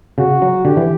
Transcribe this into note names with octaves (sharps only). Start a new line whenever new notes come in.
C#3 F#4
F#3
D3 G4
E3